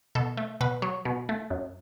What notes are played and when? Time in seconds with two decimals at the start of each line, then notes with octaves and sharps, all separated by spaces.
0.15 B2 A4
0.37 A3
0.61 B2 B4
0.82 F#3
1.05 B2
1.29 A3
1.50 F#2